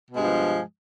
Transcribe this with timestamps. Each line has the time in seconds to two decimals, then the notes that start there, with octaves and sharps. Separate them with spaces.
0.11 B2
0.15 G#3
0.18 G2
0.22 F3